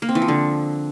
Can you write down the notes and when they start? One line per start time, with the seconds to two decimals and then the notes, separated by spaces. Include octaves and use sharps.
0.02 A#3
0.09 C4
0.15 E3
0.22 F3
0.28 D3